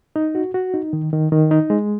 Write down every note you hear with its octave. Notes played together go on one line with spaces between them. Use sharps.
D#4
F#4
F#4
D#4
D#3
D#3
D#3
D#4
G#3